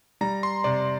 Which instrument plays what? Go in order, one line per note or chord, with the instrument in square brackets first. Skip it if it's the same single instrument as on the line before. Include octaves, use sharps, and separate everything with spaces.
[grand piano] G3 [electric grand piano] A#5
[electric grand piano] C6
[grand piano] C3 [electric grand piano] D5